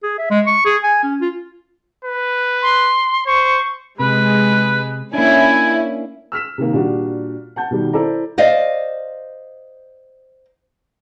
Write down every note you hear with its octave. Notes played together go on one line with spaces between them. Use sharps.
G#4
E5
G#3
C#6
G#4
G#5
C#4
F4
B4
C6
C5 C#6
C3 G#3 B4
A#3 C#4 D4 E4 G#5
E6 F6 B6 E7
C3 D#3 A#3
A#2 G3 D4 F#4 G4
F#5 A5 G6
B2 D#3 G3
E4 A4 C5 D5 A#5
C5 D5 D#5 F5